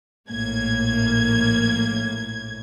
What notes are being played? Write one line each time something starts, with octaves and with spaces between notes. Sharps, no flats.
A#1 A2 A#3 G#6